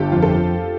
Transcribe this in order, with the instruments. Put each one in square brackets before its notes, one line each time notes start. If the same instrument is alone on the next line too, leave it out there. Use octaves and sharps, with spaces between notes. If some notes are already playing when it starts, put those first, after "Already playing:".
Already playing: [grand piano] G1 [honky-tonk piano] G4 A4
[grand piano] F2 [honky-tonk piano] F4
[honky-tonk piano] A4